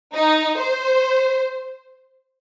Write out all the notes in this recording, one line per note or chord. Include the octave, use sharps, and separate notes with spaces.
D#4
C5